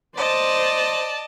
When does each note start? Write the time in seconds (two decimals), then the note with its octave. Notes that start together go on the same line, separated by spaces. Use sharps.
0.17 C5 D5 D#5 A5